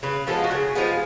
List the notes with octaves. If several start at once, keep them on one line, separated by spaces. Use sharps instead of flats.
C#3 B4
F3 G#3 B3 A4
F#4
C#3 G#4
F3 G#3 B3